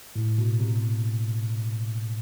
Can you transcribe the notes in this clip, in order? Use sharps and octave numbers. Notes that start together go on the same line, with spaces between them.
A2
B2
C3